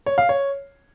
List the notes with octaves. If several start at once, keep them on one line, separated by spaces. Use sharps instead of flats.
C#5
F5
C#5